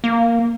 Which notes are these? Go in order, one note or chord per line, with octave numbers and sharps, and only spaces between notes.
A#3